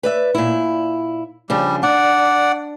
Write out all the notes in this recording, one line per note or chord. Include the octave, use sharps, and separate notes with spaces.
B4 D5 E5
A#2 E4
C#3 F3 G3 D4
D4 D5 F#5